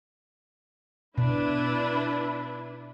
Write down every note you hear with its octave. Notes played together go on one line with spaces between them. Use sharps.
B2 D4 E4 B4